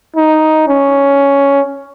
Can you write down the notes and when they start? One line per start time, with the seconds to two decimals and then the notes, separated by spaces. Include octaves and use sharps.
0.16 D#4
0.68 C#4